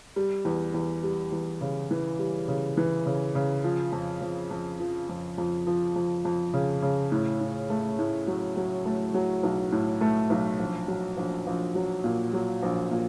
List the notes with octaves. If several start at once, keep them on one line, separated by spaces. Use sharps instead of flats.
G3
E2
E2
G3
E2
C#3
E3
G3
C#3
E3
C#3
C#3
F3
F2
F2
F2
F3
F2
F2
F3
F2
F2
C#3
C#3
A2
A2
A3
A2
F#3
F#3
A3
F#3
B1
A2
A3
B1
A#1
F#3
A#1
A#1
F#3
A#2
F#3
A#1
A#2